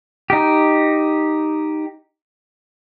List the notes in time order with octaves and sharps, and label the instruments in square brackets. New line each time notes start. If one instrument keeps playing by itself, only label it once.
[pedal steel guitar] D#4 G4